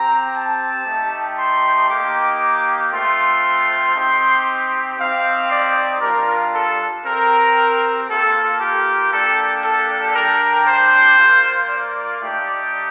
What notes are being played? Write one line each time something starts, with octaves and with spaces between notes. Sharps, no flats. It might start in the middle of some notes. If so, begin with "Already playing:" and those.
Already playing: C4 G4 A#5
A5
A3 D#4 G4
C6
A#3 D#4 G4 D6
A3 C4 F4 C6
C4 D#4 G4
C4 D#4 G4 F5
D5
G3 D4 F4 A#4
A4
C4 G4 A#4
A#3 F4 A4
G4
A#3 D4 G4 A4
A4
G3 D4 G4 A#4
C5
A#3 F4
D5
A3 D#4 G4